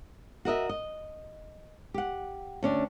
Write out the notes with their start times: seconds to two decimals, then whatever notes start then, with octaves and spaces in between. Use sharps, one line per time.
0.45 F#4 A#4 D#5 E5
0.69 D#5
1.94 G4 F#5
2.63 D2 C#4 D4